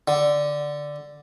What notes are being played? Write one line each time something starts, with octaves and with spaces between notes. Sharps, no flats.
D3